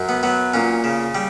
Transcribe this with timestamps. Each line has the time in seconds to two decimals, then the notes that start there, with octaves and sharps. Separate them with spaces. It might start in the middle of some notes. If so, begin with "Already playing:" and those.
Already playing: F#2
0.09 B3
0.23 F#3 B3
0.54 A#2 C#4
0.84 C#3
1.15 G3